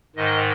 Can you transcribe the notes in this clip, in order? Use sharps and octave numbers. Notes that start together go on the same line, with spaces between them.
G#2 D#3 D#5